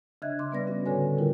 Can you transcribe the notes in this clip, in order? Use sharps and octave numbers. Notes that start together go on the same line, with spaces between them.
C#3 D4 D#5 E5 F#6 G#6
C#3 C6 D6
C#3 G3 B3 B4 D5 A#6
C#4 F#4
A2 D3 A4 B4 C#5 G#5
D3 D#3 G3 E4 F4 A#4